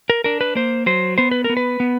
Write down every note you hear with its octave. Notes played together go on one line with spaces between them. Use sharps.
A#4
D4 A#4
B4
A#3 C5
F#3 C5
B3 C5
B4
A#4
B3
B4
B3